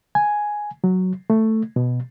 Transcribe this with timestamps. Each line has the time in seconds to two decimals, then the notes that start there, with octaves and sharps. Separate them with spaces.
0.15 G#5
0.84 F#3
1.30 A3
1.76 B2